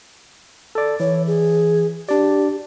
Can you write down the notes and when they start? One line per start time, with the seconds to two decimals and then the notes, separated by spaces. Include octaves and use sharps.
0.75 A4 D5
1.00 E3 C#5
1.27 G#4
2.09 D4 G4 D5